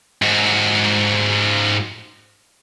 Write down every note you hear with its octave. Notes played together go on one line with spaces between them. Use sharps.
G#2 F#4